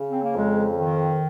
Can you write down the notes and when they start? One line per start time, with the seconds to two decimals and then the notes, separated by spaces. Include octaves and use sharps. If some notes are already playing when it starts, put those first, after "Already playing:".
Already playing: C#3
0.10 C4
0.22 A#3
0.35 F2 G#3
0.77 D#3